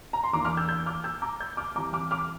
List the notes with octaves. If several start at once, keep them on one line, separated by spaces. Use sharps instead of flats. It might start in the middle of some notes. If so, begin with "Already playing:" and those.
A#5
C6
E2 E3 A#3 D4 A#5 D6
D6 F6
E6 G6
E6 G6
D6 F6
E6 G6
A#5 D6
E6 G6
D6 F6
F2 E3 G3 A#5 D6
D6 F6
D6 F6